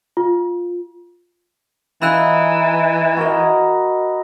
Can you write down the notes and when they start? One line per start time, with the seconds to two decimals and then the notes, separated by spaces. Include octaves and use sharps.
0.17 F4
2.02 E3 D#4 F4 G#4 B5 E6 F#6
3.17 F#4 A#4 D#5